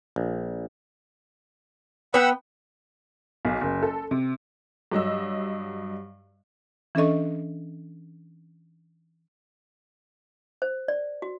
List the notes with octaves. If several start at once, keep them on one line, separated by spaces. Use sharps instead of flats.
A#1
B3 F#5 G5 B5 E6
B1
F#1
A4
C3
G2 F#3 D#5 E6
E3 C#4 D4 A4 D#5 C#6
C5
D5
F#4